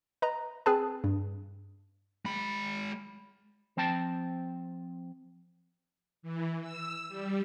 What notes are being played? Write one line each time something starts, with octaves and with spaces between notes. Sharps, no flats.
B4 D#5 A#5
C4 G#4 B4 A5
G2
G#3 B5
F3 C4 G5 A5
E3
E6
G3